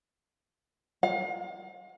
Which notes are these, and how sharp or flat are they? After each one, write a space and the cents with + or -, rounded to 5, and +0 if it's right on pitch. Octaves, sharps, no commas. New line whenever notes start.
F5 +35